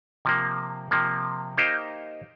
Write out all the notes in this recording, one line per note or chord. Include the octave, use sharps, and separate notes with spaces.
C3 F3 A#3
C3 F3 A#3
A#3 D#4 G4 C5 F5